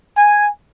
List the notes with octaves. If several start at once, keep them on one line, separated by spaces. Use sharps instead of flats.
G#5